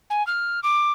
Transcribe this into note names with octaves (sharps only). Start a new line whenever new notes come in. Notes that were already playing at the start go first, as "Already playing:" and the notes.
G#5
F6
D6